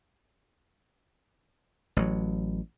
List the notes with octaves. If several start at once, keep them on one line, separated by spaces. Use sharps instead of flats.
A1 F#3